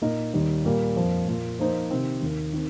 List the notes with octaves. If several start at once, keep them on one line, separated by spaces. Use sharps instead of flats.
A#2 A#3 D#4 A#4 D#5
D#2 D#3 G3 D#4
A#2 G3 A#3
F2 F3 A#3
A#2 A#3 F4
F3 A#3 D#4 C5
C3 D#3 C4
D#2 D#3 A#3
D#3 C4